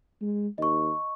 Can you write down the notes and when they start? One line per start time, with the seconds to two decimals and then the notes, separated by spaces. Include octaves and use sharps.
0.21 G#3
0.58 D#2 D#5 C#6